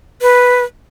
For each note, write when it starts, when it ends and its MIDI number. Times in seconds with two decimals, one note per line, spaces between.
0.22 0.63 71